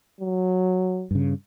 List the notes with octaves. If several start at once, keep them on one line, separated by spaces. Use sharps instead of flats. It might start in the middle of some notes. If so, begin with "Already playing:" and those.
F#3
G2 C#3